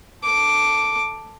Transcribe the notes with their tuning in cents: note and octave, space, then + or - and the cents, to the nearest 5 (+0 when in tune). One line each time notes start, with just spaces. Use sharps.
A4 +0 D6 +0